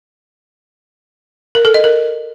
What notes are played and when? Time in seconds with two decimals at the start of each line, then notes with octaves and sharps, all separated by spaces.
1.55 A#4
1.65 A4
1.74 D#5
1.84 A#4